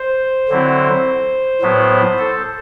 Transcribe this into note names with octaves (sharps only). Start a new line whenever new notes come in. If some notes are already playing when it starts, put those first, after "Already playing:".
Already playing: C5
D3 F#3 C4 E4
A2 F#3 B3 E4
A4